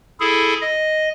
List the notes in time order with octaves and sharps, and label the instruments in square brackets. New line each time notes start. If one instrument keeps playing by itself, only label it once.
[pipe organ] E4 G#4 A4
D#5